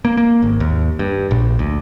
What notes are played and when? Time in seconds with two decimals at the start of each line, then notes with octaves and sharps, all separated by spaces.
0.05 A#3
0.17 A#3
0.42 G#1
0.60 D#2
0.99 G2
1.31 A#1
1.59 D2